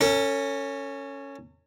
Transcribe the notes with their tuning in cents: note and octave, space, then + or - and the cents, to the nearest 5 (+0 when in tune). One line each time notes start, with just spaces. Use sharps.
C#4 +0 A4 +45